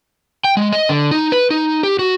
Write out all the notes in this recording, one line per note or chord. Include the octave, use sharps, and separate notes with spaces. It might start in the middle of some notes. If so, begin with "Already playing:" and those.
G5
G#3
D#5
D3
D#4
B4
D#4
G4
F#4